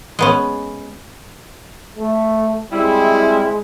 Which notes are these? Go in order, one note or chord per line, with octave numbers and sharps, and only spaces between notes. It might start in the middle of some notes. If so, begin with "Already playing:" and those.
G#3 B3 C#4
A3
G3 G#3 C4 E4